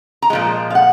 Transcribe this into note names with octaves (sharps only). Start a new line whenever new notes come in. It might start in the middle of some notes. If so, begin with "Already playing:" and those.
A#5
A#2 F3 G#3
F5
F#5